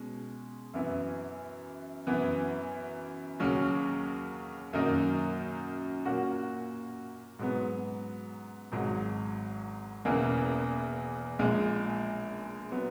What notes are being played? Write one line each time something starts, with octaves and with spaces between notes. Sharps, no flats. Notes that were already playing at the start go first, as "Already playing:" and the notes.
Already playing: B2 G#3 C#4
F#2 E3 B3 E4
F#2 E3 B3
D#2 C#3 F#3 C#4
F#2 D#3 F#3 A#3 D#4
A#2 A#3 C#4 F#4
G#2 F#3 B3
G#1 G#2 F#3
E1 E2 C#3 E3 A#3
A#1 A#2 G#3
F#3 B3